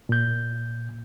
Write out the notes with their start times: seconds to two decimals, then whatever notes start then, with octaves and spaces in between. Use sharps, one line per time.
0.09 A#2 G6